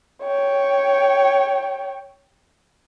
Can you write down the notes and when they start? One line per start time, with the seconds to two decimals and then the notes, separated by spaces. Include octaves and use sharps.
0.23 C#5 G5